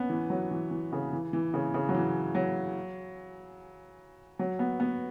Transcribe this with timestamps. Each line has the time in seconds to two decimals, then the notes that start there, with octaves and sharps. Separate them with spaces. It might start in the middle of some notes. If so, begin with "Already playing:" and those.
Already playing: B3 C#4
0.10 E3
0.30 F#3
0.51 E3
0.71 E3
0.92 C#3
1.13 E3
1.33 E3
1.54 C#3
1.74 C#3
1.89 F#3
1.95 E3
2.35 F#3
4.39 F#3
4.59 B3
4.80 B3